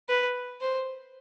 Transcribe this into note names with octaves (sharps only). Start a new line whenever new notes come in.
B4
C5